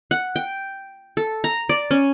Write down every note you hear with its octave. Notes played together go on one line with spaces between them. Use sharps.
F#5
G5
A4
A#5
D5
C#4